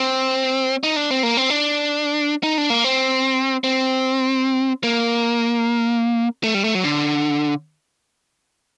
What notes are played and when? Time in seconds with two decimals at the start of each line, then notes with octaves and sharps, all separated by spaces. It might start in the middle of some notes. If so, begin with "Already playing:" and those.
Already playing: C4
0.83 D#4
0.96 D4
1.11 C4
1.23 A#3
1.37 C4
1.50 D4
2.43 D#4
2.58 D4
2.70 A#3
2.84 C4
3.64 C4
4.83 A#3
6.44 A3
6.54 G3
6.64 A3
6.75 F#3
6.84 D3